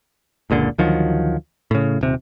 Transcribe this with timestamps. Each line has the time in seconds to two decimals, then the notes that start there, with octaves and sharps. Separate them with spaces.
0.50 F#1 C#2 A#2 D3
0.78 D2 D#3 F3 F#3
1.71 A2 C#3
2.01 D#1 C3